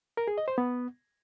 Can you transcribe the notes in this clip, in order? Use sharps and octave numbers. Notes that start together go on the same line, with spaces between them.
A#4
G#4
D#5
C5
B3